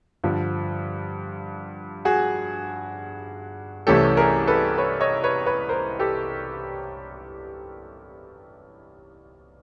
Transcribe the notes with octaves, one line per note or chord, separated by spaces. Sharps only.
G2 D3 F3
F#4 G#4
C2 C3 E3 A3 C#4 G4 A4
G#4 A#4
A4 B4
B4 C#5
C#5 D#5
B4 C#5
B4 C#5
A#4 C5
G4 A4